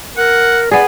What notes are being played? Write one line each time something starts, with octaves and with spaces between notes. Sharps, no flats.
A#4 F#5
B3 G#4 D5